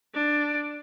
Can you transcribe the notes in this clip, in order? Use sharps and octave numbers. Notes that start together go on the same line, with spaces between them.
D4